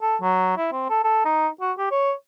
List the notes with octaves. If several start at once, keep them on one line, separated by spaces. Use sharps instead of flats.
A4
F#3
E4
C4
A4
A4
D#4
F#4
G4
C#5